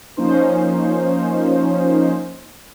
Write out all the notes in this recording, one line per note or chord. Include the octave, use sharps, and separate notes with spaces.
F3 A#3 C#4 D#4 C5